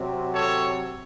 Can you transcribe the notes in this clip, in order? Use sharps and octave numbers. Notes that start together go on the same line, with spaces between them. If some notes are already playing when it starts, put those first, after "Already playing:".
Already playing: C3 F#3 C4
A4 C#5